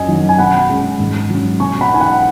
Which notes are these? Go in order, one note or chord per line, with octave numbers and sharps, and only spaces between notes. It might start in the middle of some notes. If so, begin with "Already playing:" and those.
Already playing: F#2 D#5 G#5
D#3 F#3 D#4
G#5
B2 F#5 B5
G#3 C#4
G#2
F#3 C#4
B2 G#5 C#6
F#5 B5
B3 D#4 G#5
F#5 B5